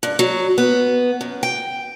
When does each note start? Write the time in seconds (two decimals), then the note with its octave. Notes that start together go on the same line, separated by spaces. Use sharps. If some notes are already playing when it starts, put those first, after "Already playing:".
0.03 G2
0.19 F#3
0.58 B3
1.21 F#2
1.43 G5